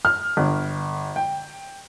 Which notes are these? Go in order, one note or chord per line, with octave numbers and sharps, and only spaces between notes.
F6
G1
G5